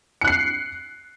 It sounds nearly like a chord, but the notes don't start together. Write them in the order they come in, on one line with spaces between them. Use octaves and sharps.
C#7 F#6 C7